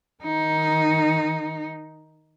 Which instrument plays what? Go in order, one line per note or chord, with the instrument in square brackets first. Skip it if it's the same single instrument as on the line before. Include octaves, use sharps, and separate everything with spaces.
[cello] D#3 D#4